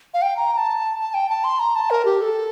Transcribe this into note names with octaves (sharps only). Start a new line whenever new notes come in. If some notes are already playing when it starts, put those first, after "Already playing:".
F5
G5
A#5
A#5
A5
A5
G5
A5
C6
A#5
A5
A#4
G4
A4